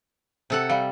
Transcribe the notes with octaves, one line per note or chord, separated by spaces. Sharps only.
C3 A4 F#5
G3 F5